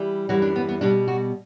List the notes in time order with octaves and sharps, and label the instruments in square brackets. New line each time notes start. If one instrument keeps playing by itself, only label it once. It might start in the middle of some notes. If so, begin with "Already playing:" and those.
Already playing: [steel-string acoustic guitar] E3 G3
F#2 E3 G3 F#4
D4
B3
B3
B2 G3 D4
F#4